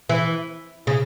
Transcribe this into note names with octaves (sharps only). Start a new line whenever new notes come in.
E3
C#3